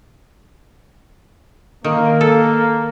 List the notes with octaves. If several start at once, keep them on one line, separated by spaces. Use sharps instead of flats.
D#3 A#3
A4